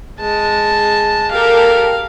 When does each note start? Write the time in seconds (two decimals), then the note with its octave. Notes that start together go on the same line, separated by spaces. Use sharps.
0.20 G#3 A5
1.31 G4 A4 A#4 F5